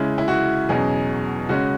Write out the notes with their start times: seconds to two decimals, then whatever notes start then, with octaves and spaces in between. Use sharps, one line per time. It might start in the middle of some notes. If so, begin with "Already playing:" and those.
Already playing: C#3 G#3 C#4 E4
0.18 E4
0.28 F#4
0.69 E2 B2 F#3 C#4 G#4
1.49 C#3 G#3 C#4 F#4